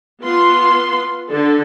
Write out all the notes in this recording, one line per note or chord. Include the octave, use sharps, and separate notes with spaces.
B3 F4 C6
D3 A4